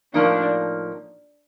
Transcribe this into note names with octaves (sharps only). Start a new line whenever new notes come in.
A2 F3 A#3 D4 D#4